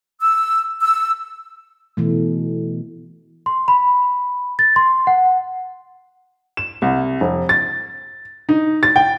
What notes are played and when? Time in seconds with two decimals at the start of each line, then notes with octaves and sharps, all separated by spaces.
0.22 E6
0.82 E6
1.97 B2 E3 A3
3.46 C6
3.68 B5
4.59 A6
4.76 C6
5.07 F#5
6.57 E7
6.82 C2
7.21 F1
7.49 A6
8.49 D#4
8.83 A6
8.96 G5